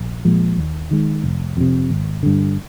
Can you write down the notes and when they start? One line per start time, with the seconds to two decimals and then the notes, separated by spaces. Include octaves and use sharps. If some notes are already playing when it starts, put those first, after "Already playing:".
Already playing: A#1
0.25 A#2 F3 G#3
0.58 D#2
0.91 D#3 G#3
1.24 F1
1.57 F2 C3
1.90 G#1
2.23 G2 D3